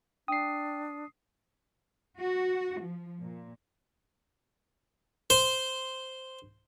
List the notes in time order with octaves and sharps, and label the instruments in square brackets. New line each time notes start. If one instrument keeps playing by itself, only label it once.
[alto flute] D4 [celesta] G5 [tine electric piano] D#6 C7
[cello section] F#4
F3
A#2
[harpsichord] C5